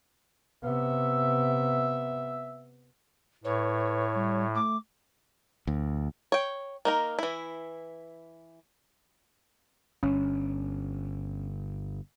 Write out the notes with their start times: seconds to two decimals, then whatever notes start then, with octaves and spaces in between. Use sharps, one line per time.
0.64 C3 B3 E5
3.44 A2 B4 C#5
4.14 G3
4.54 A3 D6
5.67 D2
6.32 C#5 G5
6.85 A#3 D#4 A#4
7.19 E3 E4
10.03 G1 C#4